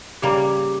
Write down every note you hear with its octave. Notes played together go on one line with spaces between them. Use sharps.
C#3 G3 A#3 G4